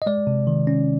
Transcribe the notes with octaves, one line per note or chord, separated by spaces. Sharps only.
D#5
G#3 D5
C3
D#3
C#4